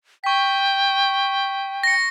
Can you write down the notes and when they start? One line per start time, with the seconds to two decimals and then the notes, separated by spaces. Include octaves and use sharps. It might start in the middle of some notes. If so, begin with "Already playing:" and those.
0.24 G5 C#6 B6
1.83 A#6 C#7